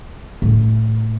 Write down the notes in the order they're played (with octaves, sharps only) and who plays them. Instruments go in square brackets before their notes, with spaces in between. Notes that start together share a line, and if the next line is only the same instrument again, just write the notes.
[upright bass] A2